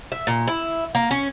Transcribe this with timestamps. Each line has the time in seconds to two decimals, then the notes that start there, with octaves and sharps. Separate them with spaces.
0.12 E5
0.27 A#2
0.48 E4
0.95 A#3
1.11 C#4